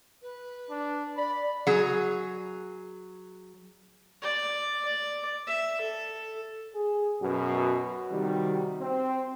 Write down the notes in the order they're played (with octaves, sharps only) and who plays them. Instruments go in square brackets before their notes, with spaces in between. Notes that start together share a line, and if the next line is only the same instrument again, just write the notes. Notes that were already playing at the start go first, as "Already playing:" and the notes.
[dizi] B4
[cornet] D4
[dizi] D5 [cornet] B5
[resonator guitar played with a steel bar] F#3 G#4
[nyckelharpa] D5
D5
E5
A4
[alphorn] G#4
[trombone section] F#2 B2 [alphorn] F#4
[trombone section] C3 D#3 G3
C4